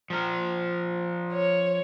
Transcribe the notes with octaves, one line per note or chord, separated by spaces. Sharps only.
F3 A#4
C#5